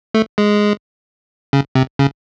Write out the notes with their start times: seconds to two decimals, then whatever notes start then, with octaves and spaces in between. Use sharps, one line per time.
0.14 A3
0.38 G#3
1.53 C#3
1.75 C3
1.99 C#3